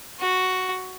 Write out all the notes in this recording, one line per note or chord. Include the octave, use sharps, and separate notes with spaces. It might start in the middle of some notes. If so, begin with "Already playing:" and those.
F#4